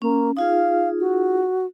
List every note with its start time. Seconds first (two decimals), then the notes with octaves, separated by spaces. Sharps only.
0.02 A#3 C#4
0.37 D#4 F4 G#4 F5
1.00 F#4